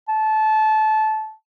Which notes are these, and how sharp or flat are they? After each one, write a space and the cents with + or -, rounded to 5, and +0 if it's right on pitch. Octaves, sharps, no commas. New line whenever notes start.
A5 -20